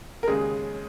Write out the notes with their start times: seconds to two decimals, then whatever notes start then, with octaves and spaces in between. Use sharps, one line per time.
0.23 A#4
0.27 D#2 C#3 G#3 G#4